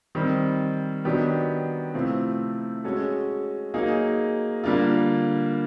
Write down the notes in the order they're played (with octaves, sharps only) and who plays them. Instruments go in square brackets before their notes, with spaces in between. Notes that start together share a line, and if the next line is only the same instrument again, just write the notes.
[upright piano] D#3 G3 C4
D#3 F#3 B3 D4 G4
C3 F3 A3 C4 E4
G#3 C#4 F#4 A4
F#3 A#3 D#4 G#4
D3 G3 A#3 D4 F4